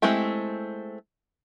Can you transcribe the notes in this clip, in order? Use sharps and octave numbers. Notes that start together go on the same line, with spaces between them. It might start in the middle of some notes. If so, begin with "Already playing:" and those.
G#3 A3 C4 E4 G4